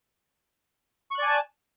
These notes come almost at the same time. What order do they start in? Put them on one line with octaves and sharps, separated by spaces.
C#6 F#6 D5 G#5 A5